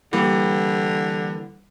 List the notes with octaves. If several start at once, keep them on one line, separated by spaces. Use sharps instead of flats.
D3 E3 G3 A#3